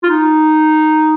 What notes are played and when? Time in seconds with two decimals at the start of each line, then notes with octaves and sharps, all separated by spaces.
0.03 F4
0.07 D#4